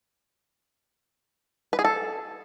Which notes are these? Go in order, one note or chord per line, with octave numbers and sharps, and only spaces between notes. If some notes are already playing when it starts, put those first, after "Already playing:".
B4
G#4
A4